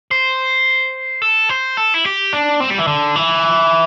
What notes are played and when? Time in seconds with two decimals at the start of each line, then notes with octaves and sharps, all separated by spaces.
0.11 C5
1.22 A4
1.49 C5
1.77 A4
1.94 E4
2.05 G4
2.33 D4
2.60 C4
2.70 G3
2.79 E3
2.87 D3
3.16 E3